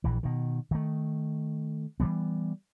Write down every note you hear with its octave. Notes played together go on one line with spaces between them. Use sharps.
A#1 E3
B2 D#3
D#3 A3
E3 F3 G3 B3